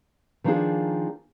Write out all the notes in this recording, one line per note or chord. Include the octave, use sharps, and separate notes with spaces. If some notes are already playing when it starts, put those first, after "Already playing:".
D#3 F3 A#3 B3 D4 G#4